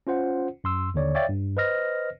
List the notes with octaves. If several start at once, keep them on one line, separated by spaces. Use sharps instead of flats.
C#4 F4 C5 F#5
F#2 C6 E6
D#2 D3 C#5 D5
C#5 D5 E5 F5 G5 A6
G2
B4 C5 D#5 F6 A#6